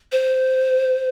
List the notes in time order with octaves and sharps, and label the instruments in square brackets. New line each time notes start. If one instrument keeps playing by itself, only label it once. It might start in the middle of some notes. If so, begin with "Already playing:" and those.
[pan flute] C5